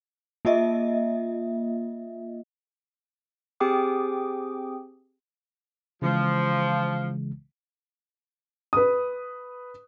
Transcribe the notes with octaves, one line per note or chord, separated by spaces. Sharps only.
A#3 F4 D#5 E5
C4 G4 G#4 G5 D6 D#6
C#3 E3 F3 G#3
B4 D#6